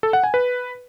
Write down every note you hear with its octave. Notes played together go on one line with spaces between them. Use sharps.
A4
F#5
G#5
B4